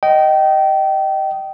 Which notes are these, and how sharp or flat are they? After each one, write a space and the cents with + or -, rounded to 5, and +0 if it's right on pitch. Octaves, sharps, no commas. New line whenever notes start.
D#5 +0 G5 -25